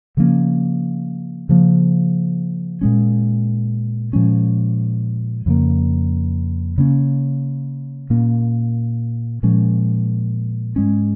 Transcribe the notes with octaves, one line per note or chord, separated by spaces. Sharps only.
C#3 F3 A#3 C#4
C#3 F3 A#3
A#2 G#3 C#4
A#2 F3 G#3 C#4
F2 C#3 A#3
C#3 A#3 C#4
A#2 A#3 C#4
A#2 F3 G#3 C#4
G#2 G#3 C#4